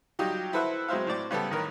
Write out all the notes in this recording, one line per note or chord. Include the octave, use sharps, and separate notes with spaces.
F#3 G3 D#4 F4 G4
E4 A4 B4 C5 E5 F#5
F#3 G#3 C4 C5 E5 F5
A2 C5 D5 D6
C#3 G3 B3 A4
A1 D#3 A#4 B4 C#5